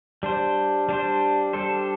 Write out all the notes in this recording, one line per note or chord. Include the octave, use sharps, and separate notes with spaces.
G3 D4 C5
G3 D4 C5
G3 D4 A4 C5